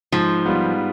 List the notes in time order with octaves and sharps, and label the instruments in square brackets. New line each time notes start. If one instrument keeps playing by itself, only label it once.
[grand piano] G#2 [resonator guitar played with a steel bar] F3
[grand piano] G3 B3 F4